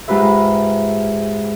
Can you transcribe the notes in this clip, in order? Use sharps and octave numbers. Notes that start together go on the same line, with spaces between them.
G#2 G#3 F4 G4 B4 E5